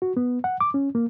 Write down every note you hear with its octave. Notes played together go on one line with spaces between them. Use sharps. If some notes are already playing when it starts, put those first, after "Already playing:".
F#4
B3
F#5
D6
C#4
A#3